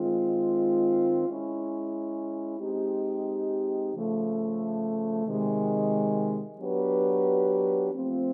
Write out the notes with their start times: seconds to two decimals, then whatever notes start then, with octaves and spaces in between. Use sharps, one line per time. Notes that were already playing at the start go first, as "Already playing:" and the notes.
Already playing: D#3 G#3 C4 F4
1.26 G#3 C#4 E4
2.58 G#3 C4 D#4 G4
3.93 C#3 F3 A3
5.25 C3 D#3 G#3
6.59 F#3 B3 D4 G4 B4
7.92 F3 A3 C4 F4